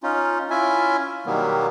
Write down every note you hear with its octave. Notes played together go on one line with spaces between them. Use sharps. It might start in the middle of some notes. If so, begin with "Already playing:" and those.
C#4 D#4 F4
C#4 E4 F4 E5 G#5
B2 D#3 F#3 G3 A#3 B3